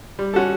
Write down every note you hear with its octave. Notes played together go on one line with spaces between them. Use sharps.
G3
C#4 F#4 A4